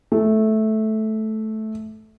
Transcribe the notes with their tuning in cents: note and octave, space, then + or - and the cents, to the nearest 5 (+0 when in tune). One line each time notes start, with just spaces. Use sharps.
A3 -10